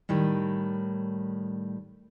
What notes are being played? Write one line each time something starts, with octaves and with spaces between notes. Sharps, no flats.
A2 D#3 G3